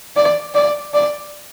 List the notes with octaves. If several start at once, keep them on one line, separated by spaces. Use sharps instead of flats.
D5
D5
D5